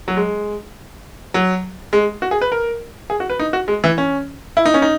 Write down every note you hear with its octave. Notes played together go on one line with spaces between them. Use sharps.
F#3
G#3
F#3
G#3
F#4
G#4
B4
A#4
G#4
F#4
B4
D#4
F#4
G#3
E3
C#4
E4
D#4
C#4
D#4